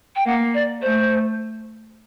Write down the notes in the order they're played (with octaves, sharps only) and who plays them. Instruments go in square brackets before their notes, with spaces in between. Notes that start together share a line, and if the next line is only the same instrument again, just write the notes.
[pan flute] G5
[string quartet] A#3 [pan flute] F#5
[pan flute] D5
[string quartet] A3 [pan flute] C5